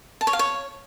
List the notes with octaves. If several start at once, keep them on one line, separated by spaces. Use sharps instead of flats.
A5
C#5
F5
C#5